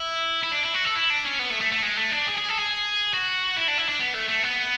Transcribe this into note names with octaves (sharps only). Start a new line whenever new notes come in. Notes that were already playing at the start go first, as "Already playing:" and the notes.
Already playing: E4
E4
D4
E4
F#4
A4
E4
D4
C#4
B3
A3
A3
A3
G#3
A3
D4
G#4
G#4
A4
G#4
F#4
E4
D4
E4
D4
B3
A3
A3
B3